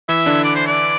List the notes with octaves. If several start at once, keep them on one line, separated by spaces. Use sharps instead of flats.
E3 E4 E5
D3 D4
D5
C5
D5